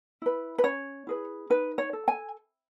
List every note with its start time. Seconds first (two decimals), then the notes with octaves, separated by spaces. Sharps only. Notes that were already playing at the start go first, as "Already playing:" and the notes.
0.22 E4 B4
0.58 B4
0.64 C#4 C#5
1.07 E4 G#4 B4
1.50 D#4 B4
1.78 C#5
1.93 A4
2.08 G#5